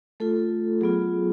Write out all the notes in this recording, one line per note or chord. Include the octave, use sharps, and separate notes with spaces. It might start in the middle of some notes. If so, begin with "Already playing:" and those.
A3 F4 A4
F#3 B3 F4 G#4